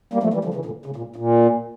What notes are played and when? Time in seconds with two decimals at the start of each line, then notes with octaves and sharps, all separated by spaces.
0.13 G3 A#3
0.23 F3 A3
0.34 E3 G3
0.45 D3 F3
0.54 C#3 E3
0.65 A#2 D3
0.86 C#3
0.96 A#2
1.16 A#2